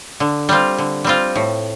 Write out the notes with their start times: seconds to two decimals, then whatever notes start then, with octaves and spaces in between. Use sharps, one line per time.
0.20 D3
0.49 G3 C4 F4
0.78 D3
1.04 G3 C4 F4
1.36 A2